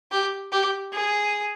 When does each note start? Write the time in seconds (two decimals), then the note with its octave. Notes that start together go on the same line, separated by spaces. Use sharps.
0.12 G4
0.52 G4
0.93 G#4